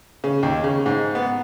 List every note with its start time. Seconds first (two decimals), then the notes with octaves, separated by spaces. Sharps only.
0.24 C#3
0.43 D#2
0.64 C#3
0.86 G#2
1.15 B3